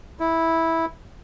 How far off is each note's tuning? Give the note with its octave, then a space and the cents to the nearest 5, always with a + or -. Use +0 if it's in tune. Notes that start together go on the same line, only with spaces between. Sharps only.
E4 -10